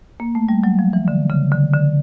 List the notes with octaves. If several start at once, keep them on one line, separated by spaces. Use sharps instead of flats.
A#3
A3
G3
F#3
F3
E3
D3
C#3
D3
D3